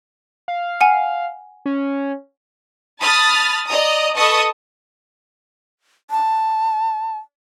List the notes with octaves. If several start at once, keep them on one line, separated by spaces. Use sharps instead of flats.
F5
F#5 G#5
C#4
A5 B5 D#6 F6 A6
D5 D#5 A#5 D#6
A4 B4 D#5 A5 C#6 D#6
A5